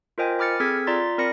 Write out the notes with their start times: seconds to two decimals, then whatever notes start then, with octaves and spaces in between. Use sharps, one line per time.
0.18 F4 A#4 C5 D#5 G5 G#5
0.39 B5 D6 F6 A6 C#7
0.60 C4 G#4 A4 E6 G#6 B6
0.87 F4 D5 A#5 C6 A6 B6
1.18 C4 A#4 D5 B5 A#6 C#7